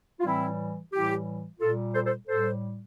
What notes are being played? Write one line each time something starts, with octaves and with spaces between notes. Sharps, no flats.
F4
A2 E3 G3 C4 E4
A2 E3 G3 E4 G4
A#2 G3 F4 A4
A4 C5
A4 C5
A2 G3 A4 C5